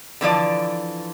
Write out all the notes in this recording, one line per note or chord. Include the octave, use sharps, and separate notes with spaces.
D3 E3 F3 D5